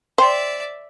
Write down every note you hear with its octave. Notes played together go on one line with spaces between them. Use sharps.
C5 D5 E5 G5 C6